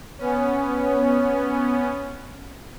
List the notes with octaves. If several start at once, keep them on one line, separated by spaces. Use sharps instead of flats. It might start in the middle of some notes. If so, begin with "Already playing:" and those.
B3 C#4